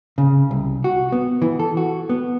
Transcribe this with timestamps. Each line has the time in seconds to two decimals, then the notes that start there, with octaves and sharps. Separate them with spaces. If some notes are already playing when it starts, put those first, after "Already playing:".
0.18 C#3
0.51 C2
0.84 F#4
1.12 B3
1.42 E3
1.60 A4
1.77 F#4
2.09 B3